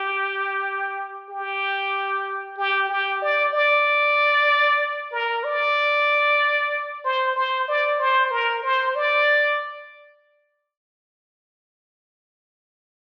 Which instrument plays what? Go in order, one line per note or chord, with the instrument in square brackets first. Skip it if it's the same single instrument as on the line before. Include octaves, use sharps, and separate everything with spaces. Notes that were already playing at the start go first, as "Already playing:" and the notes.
Already playing: [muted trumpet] G4
G4
G4
G4
D5
D5
A#4
D5
C5
C5
D5
C5
A#4
C5
D5